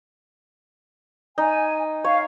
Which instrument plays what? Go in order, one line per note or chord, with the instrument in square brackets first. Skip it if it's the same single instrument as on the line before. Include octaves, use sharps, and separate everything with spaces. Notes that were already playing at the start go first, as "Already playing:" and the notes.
[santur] D#4 [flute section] G#5
[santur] C#5 [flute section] F5